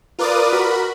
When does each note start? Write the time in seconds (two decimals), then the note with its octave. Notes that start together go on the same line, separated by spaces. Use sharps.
0.19 F4 A#4 B4 D5 D6 D#6
0.53 F#4 A#4 B5